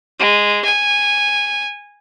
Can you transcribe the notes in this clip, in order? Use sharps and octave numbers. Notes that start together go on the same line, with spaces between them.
G#3
G#5